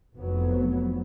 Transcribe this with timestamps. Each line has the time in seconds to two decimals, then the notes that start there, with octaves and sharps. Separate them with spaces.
0.16 F1 F2 F#3 B3